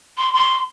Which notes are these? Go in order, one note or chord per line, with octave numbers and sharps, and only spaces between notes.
C6
C6